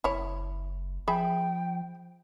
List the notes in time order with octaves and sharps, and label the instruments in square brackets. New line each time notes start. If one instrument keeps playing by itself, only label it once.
[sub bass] F#1 [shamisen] E4 C#5
[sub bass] F3 [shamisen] G#4 E5 B5 [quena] G5